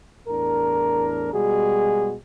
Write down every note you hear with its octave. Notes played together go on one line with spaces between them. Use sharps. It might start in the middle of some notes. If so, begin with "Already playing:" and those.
E2 A2 D4 A#4
B2 G3 G#3 F#4 G#4